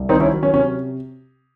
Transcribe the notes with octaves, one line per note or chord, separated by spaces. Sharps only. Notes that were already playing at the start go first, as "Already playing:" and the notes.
Already playing: C2
D#3 C4 D#4
C#4 E4
F#3
C#4
C3 C#4